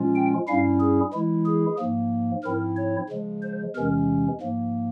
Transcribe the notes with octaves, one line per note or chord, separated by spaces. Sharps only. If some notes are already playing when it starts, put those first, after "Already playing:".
Already playing: A#2 F3 G#3 C#4 F4
G5
G2 G3 C#4 E4 F5
G#4
E3 G#3 E4
G#4
G#2 F3 A#3
G#2 F3 C4 E4 A#4
C#5
C#3 F3 G#3
C5
E2 C3 E3 G#3 C#4 A#4
G#2 F3 A#3